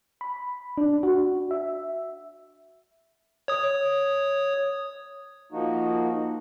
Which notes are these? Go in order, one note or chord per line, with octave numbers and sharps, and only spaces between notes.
B5
D4
F#4
E5
C#5 D#6
F3 A#3 D#4 F#4